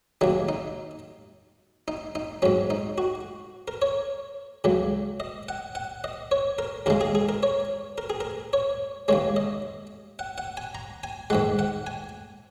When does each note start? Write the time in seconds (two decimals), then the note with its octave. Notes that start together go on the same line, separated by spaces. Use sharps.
0.21 D#2 C#3 F#3 D#4
0.49 D#4
1.88 D#4
2.15 D#4
2.42 G#2 F#3 C#4
2.70 D#4
2.98 F#4
3.68 A#4
3.82 C#5
4.64 C#2 C#3 F#3
5.20 D#5
5.49 F#5
5.75 F#5
6.04 D#5
6.31 C#5
6.59 A#4
6.86 D#2 C#3 G#3 A#4
7.01 G#4
7.15 G#4
7.29 A#4
7.43 C#5
7.98 A#4
8.10 G#4
8.21 A#4
8.53 C#5
9.08 D#2 C#3 G#3 C#5
9.36 D#5
10.19 F#5
10.38 F#5
10.57 G#5
10.75 A#5
11.04 G#5
11.30 G#2 D#3 G#3 F#5
11.59 F#5
11.87 G#5